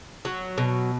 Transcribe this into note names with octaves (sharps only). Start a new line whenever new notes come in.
F#3
B2